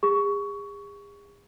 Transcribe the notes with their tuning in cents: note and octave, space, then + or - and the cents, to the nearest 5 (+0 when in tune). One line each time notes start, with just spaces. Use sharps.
G#4 -40 C#6 +15